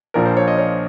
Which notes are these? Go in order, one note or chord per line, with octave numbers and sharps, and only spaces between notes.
A#1 A#2 F3 A#4
C5
C#5
D#5
C#5